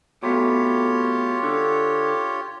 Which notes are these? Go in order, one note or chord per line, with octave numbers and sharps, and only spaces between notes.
C2 B2 A3 F4 G4 C#5
D3